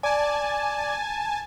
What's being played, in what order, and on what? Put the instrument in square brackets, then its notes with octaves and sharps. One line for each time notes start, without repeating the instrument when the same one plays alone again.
[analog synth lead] D5 [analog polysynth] G#5 A5